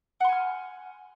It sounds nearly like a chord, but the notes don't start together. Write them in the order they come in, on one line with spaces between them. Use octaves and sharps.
F#5 C6 G#5 F6